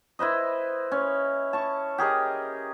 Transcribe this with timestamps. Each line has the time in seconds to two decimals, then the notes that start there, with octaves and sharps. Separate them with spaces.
0.19 E4 B4 C5 D#5
0.91 C#4
1.53 A5 C#6
1.98 G4 G#4 A#4 D#5